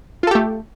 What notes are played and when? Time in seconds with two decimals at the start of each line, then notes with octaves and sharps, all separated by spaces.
0.23 F4
0.27 A4
0.31 G4
0.35 A3